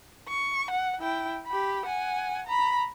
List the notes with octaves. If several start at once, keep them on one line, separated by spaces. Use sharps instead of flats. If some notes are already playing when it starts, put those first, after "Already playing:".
C#6
F#5
E4 G5
G4 B5
F#5 G#5
A#5 B5